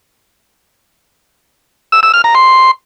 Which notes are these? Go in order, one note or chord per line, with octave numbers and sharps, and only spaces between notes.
E6
E6
F6
A#5
C6